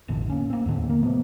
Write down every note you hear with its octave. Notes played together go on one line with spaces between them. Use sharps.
E1 A1 A2 D3
A#3 C#4
A#3 C4
D#2 A2 D3 C4
A#3
C3 F3 A3 B3